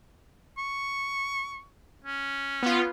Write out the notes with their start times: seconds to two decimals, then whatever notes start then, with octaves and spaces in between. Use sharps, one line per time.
0.58 C#6
2.04 C#4
2.63 B3 F4